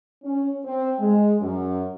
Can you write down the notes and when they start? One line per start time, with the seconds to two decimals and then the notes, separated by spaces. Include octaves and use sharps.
0.23 C#4
0.65 C4
0.99 G#3
1.41 F#2